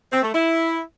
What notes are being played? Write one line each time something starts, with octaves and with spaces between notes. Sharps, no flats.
C4
A3
E4